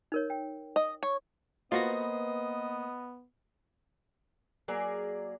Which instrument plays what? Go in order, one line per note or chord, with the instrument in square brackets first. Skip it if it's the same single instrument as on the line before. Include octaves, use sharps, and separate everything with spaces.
[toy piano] D#4 A#4 C#5
G5
[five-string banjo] D#5
C#5
[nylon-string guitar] A#3 B4 C5 [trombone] B3 [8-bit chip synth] F4 F#4 A#6 [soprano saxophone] D#5
[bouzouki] F#3 A#3 G#4 D5